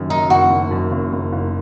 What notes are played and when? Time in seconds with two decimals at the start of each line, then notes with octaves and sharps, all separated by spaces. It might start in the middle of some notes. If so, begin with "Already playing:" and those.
Already playing: F#1 F#2 D#3
0.10 F#2 D#4
0.30 F#1 F#4
0.51 F#1
0.71 F#2
0.92 F#1
1.13 F#1
1.32 F#1